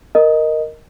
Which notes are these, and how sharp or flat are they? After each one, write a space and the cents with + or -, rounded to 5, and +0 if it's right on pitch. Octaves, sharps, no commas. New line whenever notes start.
A#4 +0 D#5 +0